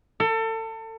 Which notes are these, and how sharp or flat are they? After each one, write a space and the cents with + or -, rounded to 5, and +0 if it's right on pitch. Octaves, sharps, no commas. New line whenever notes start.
A4 +30